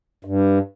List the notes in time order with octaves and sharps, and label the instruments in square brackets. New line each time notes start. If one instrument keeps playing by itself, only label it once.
[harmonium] G2